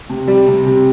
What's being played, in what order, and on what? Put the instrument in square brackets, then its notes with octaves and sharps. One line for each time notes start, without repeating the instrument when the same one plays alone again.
[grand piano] C3
G3
C3
C3